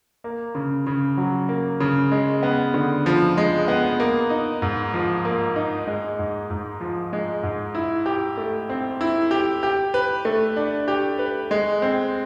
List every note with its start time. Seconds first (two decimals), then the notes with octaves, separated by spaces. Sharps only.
0.24 A#3
0.55 C#3
0.87 C#3
1.17 F#3
1.49 A#3
1.80 C#3
2.11 G#3
2.43 B3
2.74 D3
3.06 F3
3.37 G#3
3.68 B3
4.00 A#3
4.30 D#4
4.62 G#2
4.93 F3
5.25 A#3
5.56 D#4
5.87 G#3
6.19 G#2
6.50 G#2
6.81 F3
7.13 G#3
7.43 G#2
7.75 E4
8.06 G4
8.37 A3
8.69 C4
9.01 E4
9.31 G4
9.63 G4
9.94 B4
10.25 A3
10.56 D4
10.88 G4
11.19 B4
11.51 G#3
11.82 C4